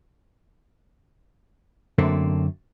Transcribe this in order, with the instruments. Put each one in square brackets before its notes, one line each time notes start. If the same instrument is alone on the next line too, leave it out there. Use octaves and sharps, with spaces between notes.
[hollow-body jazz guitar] F#2 D3 A3 A#3 C4